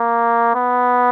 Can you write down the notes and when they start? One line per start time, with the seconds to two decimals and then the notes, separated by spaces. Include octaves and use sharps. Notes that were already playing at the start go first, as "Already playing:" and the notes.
Already playing: A#3
0.55 B3